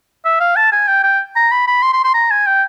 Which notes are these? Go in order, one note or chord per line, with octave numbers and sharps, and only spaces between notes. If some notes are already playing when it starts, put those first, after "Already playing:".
E5
F5
A5
G#5
G5
G5
A#5
B5
B5
C6
C6
C6
A#5
G#5
G5